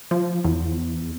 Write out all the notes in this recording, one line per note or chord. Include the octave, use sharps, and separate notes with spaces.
F3
E2